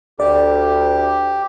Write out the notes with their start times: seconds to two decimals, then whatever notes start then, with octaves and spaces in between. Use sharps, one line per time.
0.20 D2 G4 D5